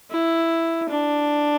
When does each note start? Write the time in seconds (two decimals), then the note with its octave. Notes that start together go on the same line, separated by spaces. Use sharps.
0.11 E4
0.89 D4